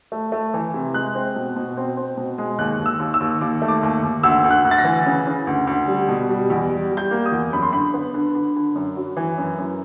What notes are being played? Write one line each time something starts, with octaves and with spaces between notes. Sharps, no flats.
A3
A3
E3
C3
G#3 F#6
C4
B2
B2
C4
C4
B2
G#3
D#2 F#6
D#2
E6
D#2
E6
D#2
D#2 D6
A3
D6
D#2
D#2
D2 E6
D2
F#6
D2
A6
A#6
E3
C#3
C#3
D2
D2
G3
B2
G3
E2
G3
G3
G6
A#3
D#6
E2
F#2 B5
C6
D3 B5
B3
D3
D3
D3
F#2
F#3
E3
F#2
F#2